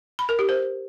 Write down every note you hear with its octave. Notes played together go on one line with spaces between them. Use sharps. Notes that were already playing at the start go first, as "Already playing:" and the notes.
B5
A#4
G4
C5